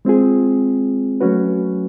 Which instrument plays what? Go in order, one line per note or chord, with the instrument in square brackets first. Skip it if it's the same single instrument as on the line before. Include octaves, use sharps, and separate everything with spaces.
[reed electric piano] G#3 C4 F4 G#4
F#3 A3 C#4 F#4 B4